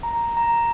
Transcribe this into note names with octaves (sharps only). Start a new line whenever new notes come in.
A#5
A#5